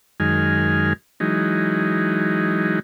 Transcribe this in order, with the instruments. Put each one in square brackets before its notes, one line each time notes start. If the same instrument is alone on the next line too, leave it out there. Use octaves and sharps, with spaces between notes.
[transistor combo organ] F#2 D#3 G#3 G#5 F6
E3 F#3 G#3 D#4